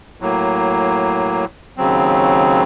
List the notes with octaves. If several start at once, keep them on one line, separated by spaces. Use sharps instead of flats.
A2 F#3 A#3
D#2 C#3 F#3 C4